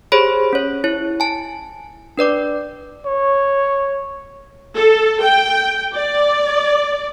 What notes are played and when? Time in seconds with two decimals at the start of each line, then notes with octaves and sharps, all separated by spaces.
0.12 G4 G#4 C5 C#5 B5
0.53 C#4 C#5
0.84 E4 C#5
1.20 G#5 A5
2.18 D4 B4 D5 D6
3.06 C#5
4.76 A4
5.23 G5
5.95 D5